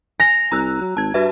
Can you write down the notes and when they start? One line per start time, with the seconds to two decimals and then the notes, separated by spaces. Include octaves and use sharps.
0.20 G#5 A#6 F7
0.52 C2 A#5 E6 F#6
0.81 F#3
0.97 G#1 A5 G#6
1.14 G2 F#4 B4 E5